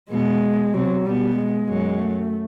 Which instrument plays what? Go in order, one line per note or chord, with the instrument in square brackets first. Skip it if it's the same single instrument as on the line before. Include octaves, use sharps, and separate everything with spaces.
[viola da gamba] B2 B3 [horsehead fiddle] G#3
[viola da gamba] C3 C4 [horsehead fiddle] F#3
[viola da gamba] B2 B3 [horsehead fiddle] G3
[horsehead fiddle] G#3
[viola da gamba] F#2 F#3
[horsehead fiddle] A3